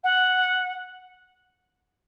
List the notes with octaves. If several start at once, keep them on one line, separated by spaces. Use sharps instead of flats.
F#5